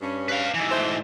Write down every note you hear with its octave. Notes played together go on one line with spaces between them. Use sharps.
G2 C#4
B4 F5
G#2 E3
A3 C5